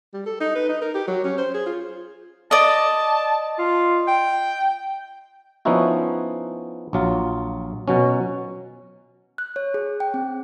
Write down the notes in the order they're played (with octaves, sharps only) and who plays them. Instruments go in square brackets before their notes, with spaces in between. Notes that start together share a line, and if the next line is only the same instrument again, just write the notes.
[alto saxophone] G3
A4
D#4
B4
D#4
A#4
G4
F#3
C#4
C5
G#4
F4
[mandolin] D5 D#5 [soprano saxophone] A5
[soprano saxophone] F4
G5
[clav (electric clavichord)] F3 B3 C#4 D#4 E4 F#4
A#1 F#3 F4
B2 F#3 C#4
[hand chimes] F#6
C#5
G#4
G5
C4